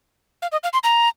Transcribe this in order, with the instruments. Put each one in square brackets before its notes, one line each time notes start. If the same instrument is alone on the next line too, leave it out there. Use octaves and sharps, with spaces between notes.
[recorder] F5
D#5
F5
C6
A#5